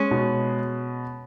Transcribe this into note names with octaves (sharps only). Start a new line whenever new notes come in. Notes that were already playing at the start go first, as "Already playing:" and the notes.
Already playing: G#3 C#4
B2